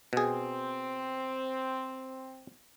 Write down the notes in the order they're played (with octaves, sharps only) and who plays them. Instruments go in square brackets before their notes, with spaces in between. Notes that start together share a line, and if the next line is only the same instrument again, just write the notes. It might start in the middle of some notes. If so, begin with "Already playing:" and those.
[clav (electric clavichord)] B2 G#4 [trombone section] C4